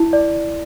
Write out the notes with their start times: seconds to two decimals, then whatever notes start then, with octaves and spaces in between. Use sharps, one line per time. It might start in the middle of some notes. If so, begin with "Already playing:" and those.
Already playing: E4
0.13 D5